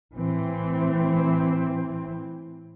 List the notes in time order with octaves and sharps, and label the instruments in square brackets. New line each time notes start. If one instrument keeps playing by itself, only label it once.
[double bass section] A2 E3 C4